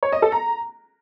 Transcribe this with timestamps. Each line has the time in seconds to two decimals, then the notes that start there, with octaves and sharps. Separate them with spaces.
0.03 C#5
0.12 D#5
0.22 A4
0.32 A#5